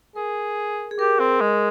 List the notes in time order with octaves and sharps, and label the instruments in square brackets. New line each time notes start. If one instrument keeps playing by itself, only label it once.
[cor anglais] G#4 [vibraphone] A#4
[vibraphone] G#4
[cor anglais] G4 [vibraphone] A#4
[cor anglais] C4
G#3